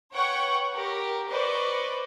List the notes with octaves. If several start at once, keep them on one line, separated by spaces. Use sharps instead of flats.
B4 C#5 F#5 G5 C#6
G4 A#4
B4 C5 D5 D#5 C#6